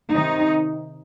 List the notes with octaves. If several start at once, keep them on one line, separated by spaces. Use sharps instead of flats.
C3 D#3 D#4